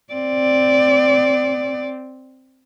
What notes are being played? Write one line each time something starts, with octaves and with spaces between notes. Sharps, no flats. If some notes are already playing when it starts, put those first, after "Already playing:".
C4 D5